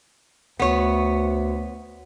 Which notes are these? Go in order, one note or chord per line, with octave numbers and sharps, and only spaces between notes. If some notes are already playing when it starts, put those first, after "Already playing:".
D2 B3 C#5